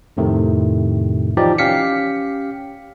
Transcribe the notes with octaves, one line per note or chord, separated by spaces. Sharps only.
F2 A2 C3 D#3 A3
E3 F3 D#4 G4 D5
C#4 G4 F5 B6 C#7